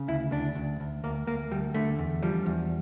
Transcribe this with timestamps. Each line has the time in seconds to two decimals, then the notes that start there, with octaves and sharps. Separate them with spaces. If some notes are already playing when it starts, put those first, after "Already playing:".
Already playing: C#3
0.08 D2 E4
0.32 D2 D4
0.55 D2
0.80 D2
1.04 D2 A#3
1.27 D2 A#3
1.51 D2 G3
1.74 D3 A3
1.99 E2
2.23 F3 G3
2.46 E2